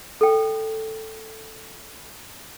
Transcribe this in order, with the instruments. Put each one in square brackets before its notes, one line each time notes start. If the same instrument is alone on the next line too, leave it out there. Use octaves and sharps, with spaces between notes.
[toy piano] A4 G5